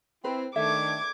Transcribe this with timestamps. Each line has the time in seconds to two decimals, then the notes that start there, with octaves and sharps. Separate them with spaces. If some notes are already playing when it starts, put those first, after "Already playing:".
0.24 C4 E4 B4
0.56 D#3 A3 D4 E5 D6 G#6